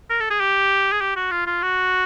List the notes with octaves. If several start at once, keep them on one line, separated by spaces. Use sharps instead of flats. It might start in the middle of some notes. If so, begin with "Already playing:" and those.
A#4
A4
G#4
G4
G#4
G4
F#4
F4
F4
F#4